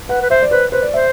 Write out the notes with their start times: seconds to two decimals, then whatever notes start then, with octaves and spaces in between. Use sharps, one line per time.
0.09 B4 F#5
0.22 B4
0.30 C5 E5
0.43 D5
0.51 B4 C5
0.72 B4 C5
0.82 D5
0.93 C5 E5